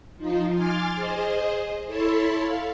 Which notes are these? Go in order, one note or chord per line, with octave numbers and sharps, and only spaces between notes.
F3 D#4 F4
G#5 C6 D6 F6 A6
G#4 C5 D#5
E4 A4 C#5 A5 B5 C6
F5